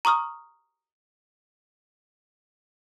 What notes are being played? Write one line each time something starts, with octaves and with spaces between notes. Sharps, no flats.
A#5 C#6 D#6 F6